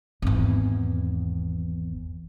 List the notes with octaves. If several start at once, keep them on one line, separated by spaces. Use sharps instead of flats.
G#1 E2